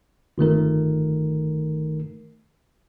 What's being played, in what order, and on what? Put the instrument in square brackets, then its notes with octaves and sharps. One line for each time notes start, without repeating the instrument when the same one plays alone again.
[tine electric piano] G1 D#3 A3 A#4